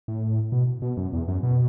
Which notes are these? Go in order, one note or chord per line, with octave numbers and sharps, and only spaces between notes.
A2
B2
B2
F#2
E2
F#2
B2